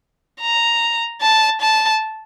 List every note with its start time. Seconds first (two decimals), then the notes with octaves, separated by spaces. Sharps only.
0.41 A#5
1.22 A5
1.61 A5